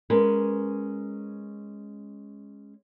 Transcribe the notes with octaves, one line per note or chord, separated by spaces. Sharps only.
G#3 C#4 A#4 B4